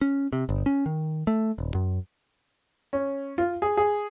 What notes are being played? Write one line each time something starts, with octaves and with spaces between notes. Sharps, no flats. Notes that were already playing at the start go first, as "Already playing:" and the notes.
C#4
C3
G1
C#4
D#3
A3
D#1
F#2
C#4
F4
G#4
G#4